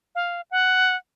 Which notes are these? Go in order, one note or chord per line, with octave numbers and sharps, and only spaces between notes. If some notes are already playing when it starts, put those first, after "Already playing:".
F5
F#5